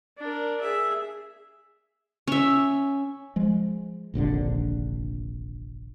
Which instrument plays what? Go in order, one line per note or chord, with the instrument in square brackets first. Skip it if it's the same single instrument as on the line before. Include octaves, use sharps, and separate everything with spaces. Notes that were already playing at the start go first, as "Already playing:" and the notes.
[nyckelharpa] D4 A#4
G#4 E5
[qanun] C#4 E5
[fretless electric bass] F3 G#3
F1 A#1 D#2 D3